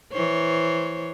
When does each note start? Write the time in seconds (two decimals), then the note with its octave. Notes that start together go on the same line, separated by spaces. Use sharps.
0.13 E3 C5 C#5